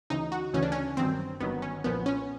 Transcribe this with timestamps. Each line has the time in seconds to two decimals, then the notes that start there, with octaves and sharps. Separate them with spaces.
0.10 D2 C#3 E3 D#4
0.32 F#4
0.53 D2 C#3 E3 C#4
0.63 D4
0.72 C#4
0.97 G1 G2 D#3 F#3 C4
1.40 G1 G2 D#3 F#3 B3
1.62 C#4
1.84 B1 A#2 F3 B3
2.06 C#4